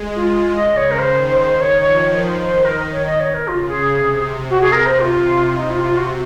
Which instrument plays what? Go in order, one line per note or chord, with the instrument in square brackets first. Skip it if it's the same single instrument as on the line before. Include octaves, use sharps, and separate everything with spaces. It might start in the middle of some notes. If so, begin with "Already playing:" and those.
Already playing: [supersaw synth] G#3
[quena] F4
[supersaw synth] C#3 [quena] D#5
[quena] C#5
A#4
[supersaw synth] D#3 [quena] C5
[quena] C5
C#5
[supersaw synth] F3 [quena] C#5
[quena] C#5
[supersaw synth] D#3 [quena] C5
[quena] C5
A#4
C#5
D#5
C#5
A#4
[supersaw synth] C#3 [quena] F4
[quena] G#4
[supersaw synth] C3
[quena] F#4
G#4
[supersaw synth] C3 [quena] A#4
[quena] C5
F4
[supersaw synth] C3 [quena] D#4
[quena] F4
F4
F#4